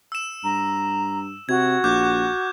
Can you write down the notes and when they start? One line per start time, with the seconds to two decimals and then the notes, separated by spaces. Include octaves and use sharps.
0.12 E6 E7
0.44 G2 A#5
1.49 C3 F#4 G#6
1.84 A#1 D6 F#6 G6